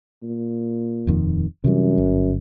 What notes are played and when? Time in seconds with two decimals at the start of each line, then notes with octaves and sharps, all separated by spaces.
0.23 A#2
1.07 D#1 F2 D#3
1.64 F#2 C3 E3 G3
1.98 G1